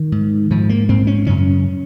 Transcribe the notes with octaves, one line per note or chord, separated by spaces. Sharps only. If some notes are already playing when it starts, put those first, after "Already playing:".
Already playing: D#3
G#2
G#2 F3
A#3
G#2 C4
C#4
F#2 C#3 C#4